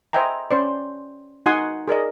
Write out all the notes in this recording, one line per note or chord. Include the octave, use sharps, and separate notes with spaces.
C5 D#5 E5 G5 G#5 A#5
C#4 C5 D5
D#4 F#4 F#5 G#5 C6 D#6
G#4 A#4 D5 D#5